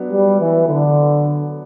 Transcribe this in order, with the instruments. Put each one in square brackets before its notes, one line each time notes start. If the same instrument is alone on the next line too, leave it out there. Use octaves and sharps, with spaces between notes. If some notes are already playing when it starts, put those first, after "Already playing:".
Already playing: [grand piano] F#3 B3 D4
[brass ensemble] G3
E3
D3